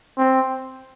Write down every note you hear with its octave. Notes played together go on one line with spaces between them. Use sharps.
C4